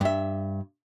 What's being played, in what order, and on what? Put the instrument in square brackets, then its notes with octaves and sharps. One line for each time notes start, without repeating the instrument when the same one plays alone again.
[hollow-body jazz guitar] G2 E5